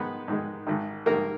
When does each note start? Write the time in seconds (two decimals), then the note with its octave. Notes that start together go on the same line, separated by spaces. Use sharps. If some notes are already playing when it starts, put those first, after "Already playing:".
Already playing: G#2 D#3 G#3 B3 B4
0.28 G#2 D#3 G#3
0.67 G#1 G#2 D#3
1.06 G#1 G#2 D#3 A#3 A#4